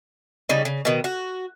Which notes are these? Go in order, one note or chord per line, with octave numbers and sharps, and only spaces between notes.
C#3 G3 D#4
C#3
B2 D#3
F#4